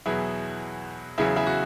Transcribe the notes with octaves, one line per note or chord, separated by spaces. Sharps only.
E2 B2 F#3 E4 G#4
E2 C#3 F#3 E4 G#4
E4 G#4
F#4